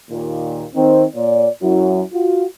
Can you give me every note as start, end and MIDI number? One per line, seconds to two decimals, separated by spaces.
0.10 0.65 39
0.10 0.65 46
0.75 1.05 51
0.75 1.05 60
1.15 1.48 46
1.15 1.48 73
1.15 1.48 74
1.63 2.04 42
1.63 2.04 54
1.63 2.04 64
2.13 2.46 65
2.13 2.46 66